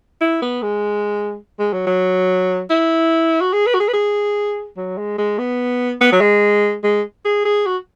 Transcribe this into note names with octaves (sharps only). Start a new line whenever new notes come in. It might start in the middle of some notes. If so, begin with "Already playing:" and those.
E4
B3
G#3
G#3
F#3
F#3
E4
F#4
G#4
B4
F#4
G#4
B4
G#4
F#3
G#3
G#3
B3
B3
F#3
G#3
G#3
G#4
G#4
F#4